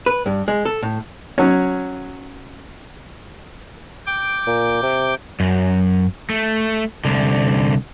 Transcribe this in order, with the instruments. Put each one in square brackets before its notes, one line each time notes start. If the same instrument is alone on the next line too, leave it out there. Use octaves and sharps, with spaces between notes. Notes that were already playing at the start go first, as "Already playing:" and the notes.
[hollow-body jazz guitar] B4
G2
G#3
A4
A2
[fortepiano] F#3 C#4
[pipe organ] G5 D6
[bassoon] A#2
C3
[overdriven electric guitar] F#2
A3
C2 D3